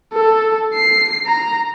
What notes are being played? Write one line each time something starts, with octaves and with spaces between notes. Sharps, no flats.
A4
C7
A#5